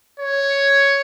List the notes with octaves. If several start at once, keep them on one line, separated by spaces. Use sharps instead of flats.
C#5